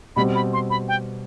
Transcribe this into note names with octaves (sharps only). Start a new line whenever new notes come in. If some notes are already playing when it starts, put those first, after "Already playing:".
B2 G3 C4 B5
B5
C6
B5
G5